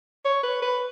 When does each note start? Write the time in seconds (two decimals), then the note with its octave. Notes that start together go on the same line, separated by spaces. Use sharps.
0.25 C#5
0.43 B4
0.62 B4